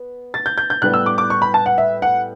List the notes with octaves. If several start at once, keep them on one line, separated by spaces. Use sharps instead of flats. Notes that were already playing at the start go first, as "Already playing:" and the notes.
Already playing: B3
A6
G6
G6
G6
A2 G3 B3 F#6
E6
D6
D6
C#6
B5
A5
F#5
E5
F#5